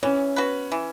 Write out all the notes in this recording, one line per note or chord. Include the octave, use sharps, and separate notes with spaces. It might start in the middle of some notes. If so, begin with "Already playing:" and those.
E3 C#4
B3 F#4 B4
E3